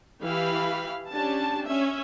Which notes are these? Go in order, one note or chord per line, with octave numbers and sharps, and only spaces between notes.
E3 G4 F5 B5
C#4 D4 G4 A5
C#4 E5